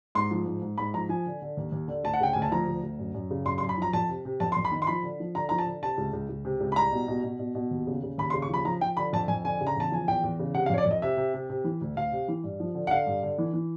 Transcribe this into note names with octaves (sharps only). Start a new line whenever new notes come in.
G#2 C6
F3
G#2
G#2
G#2 B5
F3 A#5
F3 G#5
D3
D3
D#2
D#2
D3
D2 A5
F#5
C#3 G5
D2 G#5
A5
F3 A#5
D2
D2
F#2
F#2
C#3
F#2 C6
C6
F#2
B5
F3 A#5
F2 A5
C3
C3
F2 A5
F2 C6
B5
D#3
C6
F3 B5
D3
F3
D3 A#5
F3 A#5
A5
D3
C3 A5
C#2
C#2
C#2
C3
C#2
B5
C2 A#5
B2
B2
B2
B2
B2
D#2
C#3
C#3
D#2 B5
C6
C#3
C#6
F3 B5
F3 A#5
F3 G5
D3 B5
F2 A5
F2 G#5
D3 G#5
C#3
A#5
E2 A5
F3 G#5
E2 G5
E2
C#3
C3 F#5
F5
F2 C#5
D5
F2
D#5
C3 E5
C3
C3
C3
E3
D2
D2 F5
C3
E3
G2
F3
D3
F#5
D3 F5
G2
D3
E3
E3